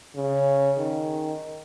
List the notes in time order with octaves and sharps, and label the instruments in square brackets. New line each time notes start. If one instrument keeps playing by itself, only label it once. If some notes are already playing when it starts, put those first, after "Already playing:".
[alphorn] C#3
D#3